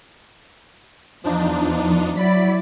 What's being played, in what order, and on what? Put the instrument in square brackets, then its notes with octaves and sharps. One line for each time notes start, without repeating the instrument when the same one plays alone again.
[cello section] E2 [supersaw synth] F3 D4 D#4
[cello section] F#3 E4 D5 [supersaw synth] B5 B6